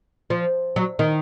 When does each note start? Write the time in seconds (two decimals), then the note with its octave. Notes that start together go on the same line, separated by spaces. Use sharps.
0.30 F3
0.76 F#3
0.99 D#3